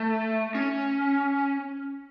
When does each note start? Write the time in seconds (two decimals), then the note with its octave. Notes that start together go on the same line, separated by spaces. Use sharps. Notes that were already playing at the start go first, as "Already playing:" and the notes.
Already playing: A3
0.55 C#4